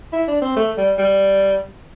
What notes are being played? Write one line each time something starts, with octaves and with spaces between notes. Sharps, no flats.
E4
D4
C4
A3
G3
G3